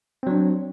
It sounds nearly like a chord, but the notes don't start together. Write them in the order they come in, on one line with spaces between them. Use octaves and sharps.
C4 F#3 D4